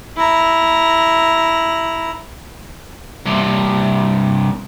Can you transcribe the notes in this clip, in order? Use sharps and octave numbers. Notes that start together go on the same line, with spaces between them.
E4 A#5
G2 C3